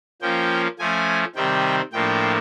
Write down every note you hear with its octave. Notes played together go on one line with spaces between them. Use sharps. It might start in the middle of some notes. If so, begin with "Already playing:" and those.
F3 A#3 C#4 G5
F3 A3 C#4 G#5
C3 D#3 G3 C4 G5
A2 F3 A#3 D4 G5